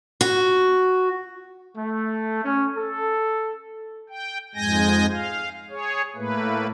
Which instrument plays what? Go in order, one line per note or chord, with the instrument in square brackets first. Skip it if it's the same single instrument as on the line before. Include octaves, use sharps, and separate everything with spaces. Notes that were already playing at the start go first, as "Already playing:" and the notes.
[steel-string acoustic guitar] F#4
[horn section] A3
C#4
A4
[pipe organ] G5
F2 G#2 G#3 G#5 G6 A#6
F5
G#4 C#5
A2 A3 A#3 B4